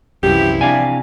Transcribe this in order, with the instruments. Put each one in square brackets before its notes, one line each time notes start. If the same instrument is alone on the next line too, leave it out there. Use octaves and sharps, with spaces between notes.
[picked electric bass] C2 F#2 [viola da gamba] E3 F3 E4 [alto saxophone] G4
[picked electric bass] C3 [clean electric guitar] D4 F5 G#5 [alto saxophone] D5